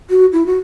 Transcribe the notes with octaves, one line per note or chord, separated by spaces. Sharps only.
F#4
E4
F#4